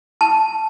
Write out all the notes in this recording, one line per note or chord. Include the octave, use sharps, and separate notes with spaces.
A5